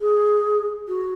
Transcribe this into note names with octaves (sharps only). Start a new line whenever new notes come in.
G#4
F#4